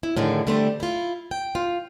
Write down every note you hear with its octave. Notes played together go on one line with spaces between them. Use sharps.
E4
A2 D3 D#3 F3 G#4
D3 G3 A3 C4 C5
E4 F4
G5
F4